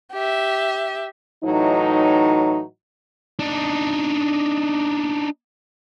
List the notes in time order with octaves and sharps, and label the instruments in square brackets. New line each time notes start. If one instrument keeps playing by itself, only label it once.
[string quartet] G4 E5
[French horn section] A2 E3 F#3 D#4
[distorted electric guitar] D4 D#4